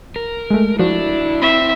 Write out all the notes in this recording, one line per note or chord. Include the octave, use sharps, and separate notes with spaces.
A#4
G#3 A3
F3 D4 E4 F#4
C4 E5 B5